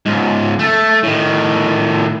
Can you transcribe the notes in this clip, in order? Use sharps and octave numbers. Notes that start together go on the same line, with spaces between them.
C#2 G#2
A3 A4
A2 D#3